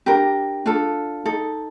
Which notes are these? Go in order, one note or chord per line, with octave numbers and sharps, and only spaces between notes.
D4 G4 A#4
D4 F4 A4
D#4 A4